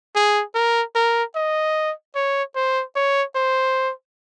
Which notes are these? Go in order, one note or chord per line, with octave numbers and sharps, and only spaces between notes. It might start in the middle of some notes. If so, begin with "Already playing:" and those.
G#4
A#4
A#4
D#5
C#5
C5
C#5
C5